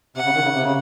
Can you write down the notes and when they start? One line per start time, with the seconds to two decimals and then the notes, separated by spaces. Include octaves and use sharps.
0.16 C3 F#5
0.25 C#3
0.35 D#3
0.45 C#3
0.54 C3
0.64 C#3